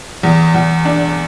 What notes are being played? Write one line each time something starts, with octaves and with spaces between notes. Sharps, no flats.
E2
E2
D4